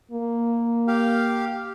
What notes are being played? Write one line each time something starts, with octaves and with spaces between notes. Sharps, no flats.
A#3
G4 F5